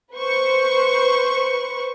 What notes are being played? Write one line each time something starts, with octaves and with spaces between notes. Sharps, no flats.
B4 C5 C#6